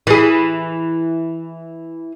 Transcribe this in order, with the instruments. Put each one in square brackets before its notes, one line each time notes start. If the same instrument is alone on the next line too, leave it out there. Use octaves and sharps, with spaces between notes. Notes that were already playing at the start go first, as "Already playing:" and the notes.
[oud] E3 G#4